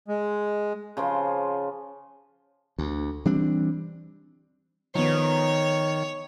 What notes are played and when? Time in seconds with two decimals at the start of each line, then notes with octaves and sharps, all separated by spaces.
0.08 G#3
0.97 C#3 F3 C5
2.78 D2
3.25 E3 G3 C4 D4
4.95 D#3 F3 B3 C#5